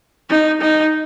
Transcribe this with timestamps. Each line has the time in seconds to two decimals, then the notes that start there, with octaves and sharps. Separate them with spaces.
0.30 D#4
0.61 D#4